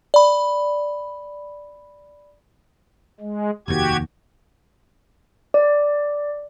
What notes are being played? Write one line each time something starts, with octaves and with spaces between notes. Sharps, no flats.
D5 B5
G#3
F1 D#2 F#4 G4 G#6
D5